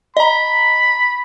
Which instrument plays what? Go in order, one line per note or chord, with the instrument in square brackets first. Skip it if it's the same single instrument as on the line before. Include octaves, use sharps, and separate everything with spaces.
[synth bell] D#5 A#5 [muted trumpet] B5